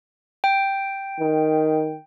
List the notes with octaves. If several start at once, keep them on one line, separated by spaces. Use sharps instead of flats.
G5
D#3